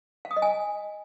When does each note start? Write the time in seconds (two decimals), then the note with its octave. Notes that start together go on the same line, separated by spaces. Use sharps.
0.25 F5
0.31 D#6
0.36 D#5
0.42 G#5